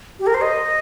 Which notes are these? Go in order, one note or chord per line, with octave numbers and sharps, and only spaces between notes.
G4
A#4
C5
D#5